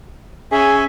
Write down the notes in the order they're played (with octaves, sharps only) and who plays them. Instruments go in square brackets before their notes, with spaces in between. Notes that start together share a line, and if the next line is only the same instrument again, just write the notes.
[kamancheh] C#4 [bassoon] G#4 [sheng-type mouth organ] E5 G#5